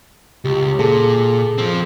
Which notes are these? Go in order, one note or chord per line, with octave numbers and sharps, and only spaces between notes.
C#2 G4
A#2 G#4 A4 A5
F3 C4